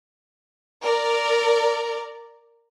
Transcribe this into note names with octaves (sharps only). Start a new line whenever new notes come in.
A#4 D5